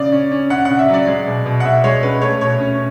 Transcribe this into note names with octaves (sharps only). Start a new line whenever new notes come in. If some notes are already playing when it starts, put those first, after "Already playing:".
Already playing: C#3 D5
C#4
C#4
C#4 F#5
C#3 F#5
E5
F#3
D5
G#3
B2
B2
F#5
B2 E5
G#3 C#5
C#4 B4
A3 C#5
B2 C#5
C#4